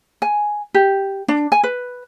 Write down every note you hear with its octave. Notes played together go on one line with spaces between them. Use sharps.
G#5
G4
D4
G#5
B4